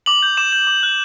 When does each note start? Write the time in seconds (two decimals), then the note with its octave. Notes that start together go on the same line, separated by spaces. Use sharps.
0.06 D6 F#7
0.23 G6
0.37 D6 E7
0.53 G6
0.67 D6
0.83 F#6